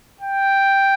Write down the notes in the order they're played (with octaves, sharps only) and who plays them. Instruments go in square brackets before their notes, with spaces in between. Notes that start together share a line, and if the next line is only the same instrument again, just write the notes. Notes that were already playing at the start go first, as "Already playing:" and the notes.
[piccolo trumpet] G5